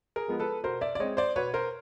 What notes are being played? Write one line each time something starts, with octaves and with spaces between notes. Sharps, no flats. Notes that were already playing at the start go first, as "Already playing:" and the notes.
G#4 A#4
F3 G#3 B3
A4 B4
B2 A#4 C5
D5 E5
D5
G#3 C4 C#5 D#5
C5 D5
B2 B4 C#5
A#4 C5